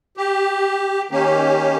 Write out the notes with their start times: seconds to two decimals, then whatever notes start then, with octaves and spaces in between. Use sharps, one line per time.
0.17 G4
1.11 D#3 A#3 C#4 G4